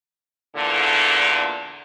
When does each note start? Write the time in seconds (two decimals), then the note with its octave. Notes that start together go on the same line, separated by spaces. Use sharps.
0.56 E2 A#2 D3